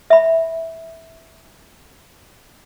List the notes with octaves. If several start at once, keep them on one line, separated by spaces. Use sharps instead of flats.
E5 B5